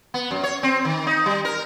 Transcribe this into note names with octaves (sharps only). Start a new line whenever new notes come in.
B3
F#2
C#5
C4
D#3
D#4
G3
A#4